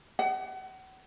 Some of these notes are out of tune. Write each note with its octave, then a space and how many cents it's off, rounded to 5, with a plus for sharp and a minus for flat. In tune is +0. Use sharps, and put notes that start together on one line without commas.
F#5 +35